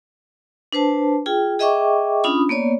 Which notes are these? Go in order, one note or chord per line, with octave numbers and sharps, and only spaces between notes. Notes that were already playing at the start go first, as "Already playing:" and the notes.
D4 B4 C5 A5
F4 G#4 G5
G#4 D#5 E5 G5 C#6 D6
C#4 D4 F4 B5 D#6
A#3 B3 C#5 D5